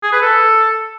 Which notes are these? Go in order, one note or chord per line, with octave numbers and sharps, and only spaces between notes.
G#4
B4
A4